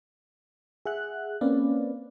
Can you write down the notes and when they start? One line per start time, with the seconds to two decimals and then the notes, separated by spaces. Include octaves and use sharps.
0.85 G#4 E5 F#5 F#6
1.41 A#3 C4 C#4 B4 D5 F5